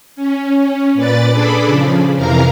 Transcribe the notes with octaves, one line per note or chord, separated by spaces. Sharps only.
C#4
A#2 B4 D5 A6
D4 G#4 A4 D5 B5
C#3 F3
F2 C3 E3 A#4 F5 A#5